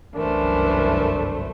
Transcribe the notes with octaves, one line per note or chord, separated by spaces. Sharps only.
G1 C2 F#2 E3 A3 D4 A#4 C5